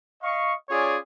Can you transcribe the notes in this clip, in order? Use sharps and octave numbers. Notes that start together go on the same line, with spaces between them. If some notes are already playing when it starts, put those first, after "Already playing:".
D#5 F5 C#6
C#4 F4 G#4 C#5 D5